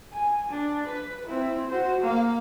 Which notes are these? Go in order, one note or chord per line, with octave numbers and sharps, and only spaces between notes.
G#5
D4
B4
C4 E4
F#4 C5
A#3 F5